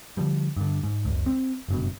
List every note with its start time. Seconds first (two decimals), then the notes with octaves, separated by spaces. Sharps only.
0.17 D3 F3 G3
0.57 G2 D3
0.84 G#2
1.05 F#1 C#2
1.26 C4
1.69 F#1 G2 B2